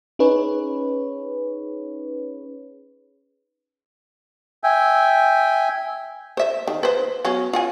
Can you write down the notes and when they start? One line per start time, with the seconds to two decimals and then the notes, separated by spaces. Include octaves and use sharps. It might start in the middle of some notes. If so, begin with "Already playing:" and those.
0.19 C#4 D#4 G#4 B4 C#5
4.63 E5 G5 G#5
6.37 C5 E5
6.68 D#3
6.83 B4 C5
7.25 F#3 B3 C#4
7.53 F4 F#5 G#5